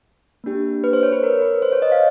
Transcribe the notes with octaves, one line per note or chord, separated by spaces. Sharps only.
A#3 D4 G4
B4
C5
C#5
B4
A#4
B4
C5
C#5
D#5
F5